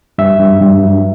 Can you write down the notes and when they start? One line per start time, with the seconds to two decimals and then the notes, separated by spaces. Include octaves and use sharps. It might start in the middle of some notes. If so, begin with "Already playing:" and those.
0.18 G2 E5
0.40 G2
0.62 G2
0.83 F#3